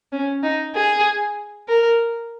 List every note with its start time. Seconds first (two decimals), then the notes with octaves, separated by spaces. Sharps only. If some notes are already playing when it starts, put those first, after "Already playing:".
0.12 C#4
0.43 D#4
0.75 G#4
1.68 A#4